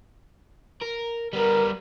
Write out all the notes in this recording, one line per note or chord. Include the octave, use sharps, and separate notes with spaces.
A#4
G3 B3 A#4